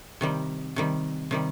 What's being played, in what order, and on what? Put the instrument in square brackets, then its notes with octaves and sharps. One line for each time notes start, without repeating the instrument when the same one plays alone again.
[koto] C3 D#3 G3
C3 D#3 G3
C3 D#3 G3